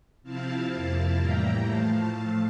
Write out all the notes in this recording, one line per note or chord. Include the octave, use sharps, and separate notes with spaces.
C3 F3 C4 E4 F5 A5
F2 C3 F3 A#3 E4
A2 E3 G3 A#3 E4 G5 A#5
A2 F3 A3 F5 A5